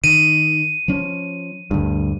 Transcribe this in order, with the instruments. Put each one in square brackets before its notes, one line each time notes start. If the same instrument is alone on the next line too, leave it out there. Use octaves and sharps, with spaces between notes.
[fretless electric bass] D#3 [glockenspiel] D#7
[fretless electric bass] F3 C#4
D2 G2